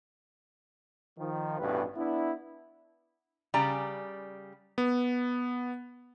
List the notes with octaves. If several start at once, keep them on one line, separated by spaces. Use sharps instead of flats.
D#3 F3
A1 G2 B2 B4
B3 D4 E4
C#3 G3 D5 G#5 A#5
B3